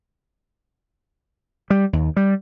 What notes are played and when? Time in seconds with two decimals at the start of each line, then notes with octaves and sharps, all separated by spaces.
1.70 G3
1.93 D#2
2.16 G3